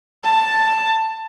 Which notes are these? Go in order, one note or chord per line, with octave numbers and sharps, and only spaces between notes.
A5